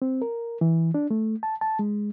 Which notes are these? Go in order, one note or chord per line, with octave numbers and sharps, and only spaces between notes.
C4
A#4
E3
D4
A3
A5
A5
G#3